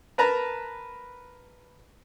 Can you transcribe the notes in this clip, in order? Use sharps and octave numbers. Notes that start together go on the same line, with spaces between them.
A#4 B4 A5 A#5